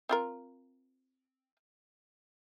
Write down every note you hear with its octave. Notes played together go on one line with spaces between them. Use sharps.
C4 F4 A#4